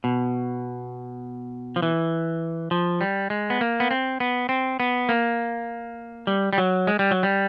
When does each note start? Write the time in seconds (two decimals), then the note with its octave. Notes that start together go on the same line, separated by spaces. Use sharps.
0.04 B2
1.76 F3
1.82 E3
2.71 F3
3.01 G3
3.30 G#3
3.50 B3
3.61 A#3
3.80 B3
3.91 C4
4.20 B3
4.49 C4
4.80 B3
5.09 A#3
6.27 G3
6.53 G3
6.58 F#3
6.87 G#3
6.99 G3
7.11 F#3
7.23 G3